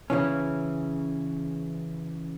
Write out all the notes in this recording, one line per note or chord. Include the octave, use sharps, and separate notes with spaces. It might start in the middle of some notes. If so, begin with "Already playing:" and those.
C#3 E3 C#4